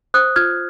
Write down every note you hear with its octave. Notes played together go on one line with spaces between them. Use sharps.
C5 D#6 F#6
F4 F6 G#6